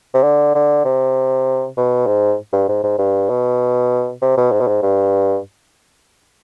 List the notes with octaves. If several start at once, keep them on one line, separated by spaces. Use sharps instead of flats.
C3
D3
D3
C3
B2
G#2
G2
G#2
G#2
G2
B2
C3
B2
G#2
B2
G#2
G2